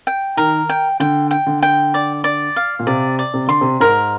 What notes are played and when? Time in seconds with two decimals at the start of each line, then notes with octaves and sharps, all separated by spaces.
0.07 G5
0.37 D#3 A#4
0.69 G5
1.00 D3 G5
1.31 G5
1.47 D3
1.63 G5
1.94 D5
2.24 D5
2.56 F5
2.79 A#2
2.87 C3 D5
3.19 D5
3.34 C3
3.48 D3 C6
3.61 C3
3.80 G#2 A#4